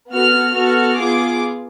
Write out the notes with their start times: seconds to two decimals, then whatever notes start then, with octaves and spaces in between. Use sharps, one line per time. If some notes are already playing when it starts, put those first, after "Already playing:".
0.11 B3 F#4 A4 F6
0.55 B3 F#4 A4 F6
0.98 B3 F4 G#4 D6